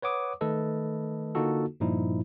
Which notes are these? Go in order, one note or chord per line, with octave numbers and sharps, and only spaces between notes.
B4 C#5 F#5 D6 D#6
D#3 A3 A4 B4 D#5
D3 A#3 D#4 F4 F#4 A4
G2 A#2 F3 D#4 E4